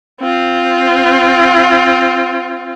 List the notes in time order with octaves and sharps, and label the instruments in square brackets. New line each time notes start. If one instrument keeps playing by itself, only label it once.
[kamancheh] C4 F4